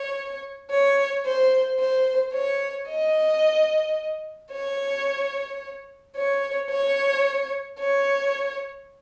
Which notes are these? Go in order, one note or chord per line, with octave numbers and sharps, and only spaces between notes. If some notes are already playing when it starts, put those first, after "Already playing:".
Already playing: C#5
C#5
C5
C5
C#5
D#5
C#5
C#5
C#5
C#5